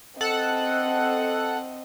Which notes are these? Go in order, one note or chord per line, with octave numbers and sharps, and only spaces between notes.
C4 A4 D#5 F#5 F#6